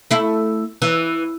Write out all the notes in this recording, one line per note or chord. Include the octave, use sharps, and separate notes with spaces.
A3 E4
E3